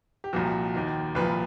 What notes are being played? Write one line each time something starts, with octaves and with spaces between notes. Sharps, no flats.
G4
C2 A#2 F3 F#4
D#2 D#3
C2 A#2 F3 B4